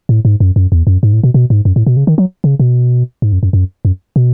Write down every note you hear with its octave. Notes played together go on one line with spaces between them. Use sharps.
A2
G#2
F#2
F#2
E2
F#2
G#2
A2
B2
B2
G#2
F#2
A2
B2
C#3
D#3
F#3
C#3
B2
G#2
F#2
F#2
F#2
F#2
B2